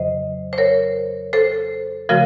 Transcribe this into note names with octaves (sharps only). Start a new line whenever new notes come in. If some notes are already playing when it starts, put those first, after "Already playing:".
Already playing: F2 C#3 F#3 C5 D#5
C5
A#4 C#5
A4 C5
C#3 F3 A3 F#4 A#4